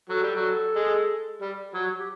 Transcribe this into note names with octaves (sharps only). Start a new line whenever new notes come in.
F#3 A4
G3
F#3
G#3
G3
F#3
G4